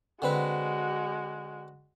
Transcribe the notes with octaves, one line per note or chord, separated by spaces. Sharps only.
D3 G#3 C4 F#4 B4